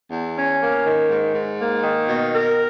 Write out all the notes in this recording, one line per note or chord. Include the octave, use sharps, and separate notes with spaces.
E2
C#4
A#3
D#3
G#2
G#2
A#3
D#3
B2
A#4